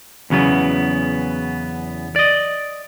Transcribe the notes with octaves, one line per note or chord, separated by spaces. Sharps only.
E2 C#3 F#3 B3
D5 D#5